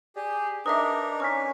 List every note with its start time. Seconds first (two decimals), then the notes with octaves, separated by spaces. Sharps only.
0.16 G4 G#4 D5
0.66 D4 D#4 A#4 B4 D#5 E5 D6 D#6
1.20 C#4 G#5 C#6 F6 B6